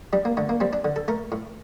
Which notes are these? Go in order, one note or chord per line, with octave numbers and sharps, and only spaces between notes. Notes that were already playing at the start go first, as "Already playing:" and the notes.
G3 D4
A#3
D3 A3
A#3
G3 C4
D4
D3
A4
A3 A#4
A2